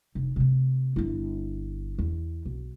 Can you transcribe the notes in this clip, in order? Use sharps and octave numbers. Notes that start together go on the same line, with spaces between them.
F1
C3 A3
G1 E4
E2
B1